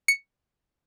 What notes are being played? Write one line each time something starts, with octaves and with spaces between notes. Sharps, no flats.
C#7